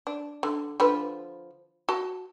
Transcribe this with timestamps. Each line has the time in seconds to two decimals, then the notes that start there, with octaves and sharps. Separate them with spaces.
0.07 D4
0.43 D3
0.80 D3 F3 B4
1.89 F#4 A5